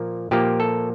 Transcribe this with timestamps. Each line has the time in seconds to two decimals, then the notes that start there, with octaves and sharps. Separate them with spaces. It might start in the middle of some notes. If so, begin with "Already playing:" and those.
Already playing: A#2 F3 A#3
0.31 A#2 F3 A#3 G4
0.60 A4